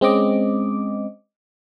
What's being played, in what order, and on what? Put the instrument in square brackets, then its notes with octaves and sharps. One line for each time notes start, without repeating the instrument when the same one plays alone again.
[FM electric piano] G#3 C4 C#4 D#5 D6